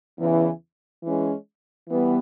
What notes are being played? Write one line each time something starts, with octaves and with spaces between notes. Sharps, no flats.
E2 C#3 E3
E3 G#3 C#4
E3 G3 B3